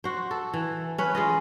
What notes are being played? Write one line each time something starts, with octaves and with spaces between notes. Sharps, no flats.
F#4 C5
A4
E3
C#4 B4
G#3 F4 D#5